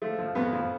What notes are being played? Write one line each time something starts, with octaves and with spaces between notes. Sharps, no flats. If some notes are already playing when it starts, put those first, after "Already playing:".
F3 A3
F3
F2 B3
F3